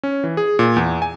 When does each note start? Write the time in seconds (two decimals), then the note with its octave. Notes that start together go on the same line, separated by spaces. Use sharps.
0.03 C#4
0.24 E3
0.37 G#4
0.59 A#2
0.76 E2
1.02 G#5